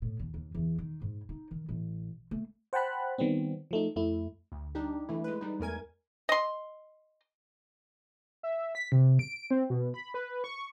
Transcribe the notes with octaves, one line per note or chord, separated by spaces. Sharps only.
A2
D#2
D#2
E2
D#3
G#2
D#4
D#3
A1
A3
C5 F#5 G5 A5 B5 F#6
D#3 G3 B3 C4
F3 A3 D#4
F2 A3 E4
D2
G3 D4 D#4 G4
E3 A3 E4
G#3 B4
G3 D#4
E2 A3 A#4 G#5 G#6
D#5 C6
E5
B6
C3
D7
C4
B2
B5
B4
C#6